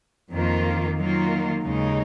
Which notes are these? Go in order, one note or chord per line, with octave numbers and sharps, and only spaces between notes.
F2 D#3 A#3 F4
D#3 F#3 A#3 F4
D#2 C#3 G#3 D#4